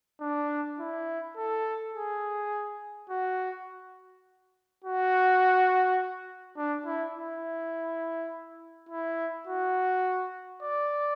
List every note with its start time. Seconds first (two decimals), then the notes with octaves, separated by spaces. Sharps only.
0.21 D4
0.80 E4
1.37 A4
1.94 G#4
3.10 F#4
4.84 F#4
6.57 D4
6.86 E4
7.16 E4
8.89 E4
9.47 F#4
10.63 D5